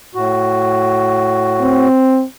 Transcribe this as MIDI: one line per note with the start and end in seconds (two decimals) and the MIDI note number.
0.15 1.88 45
0.15 1.88 66
1.61 2.23 60